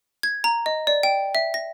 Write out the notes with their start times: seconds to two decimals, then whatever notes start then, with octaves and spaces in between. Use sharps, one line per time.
0.23 G#6
0.44 A#5
0.66 D#5
0.87 D5
1.03 G5
1.35 E5
1.54 A#6